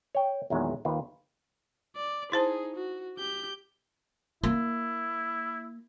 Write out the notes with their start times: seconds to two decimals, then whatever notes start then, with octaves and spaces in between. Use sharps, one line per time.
0.15 C#5 G5
0.50 E2 A#2 D#3 F#3 G#3
0.85 D#2 D#3 F4 B4
1.96 D5
2.32 D#4 E4 G#4 C5 A5
2.76 F#4
3.17 G4 G6
4.43 A#3 E4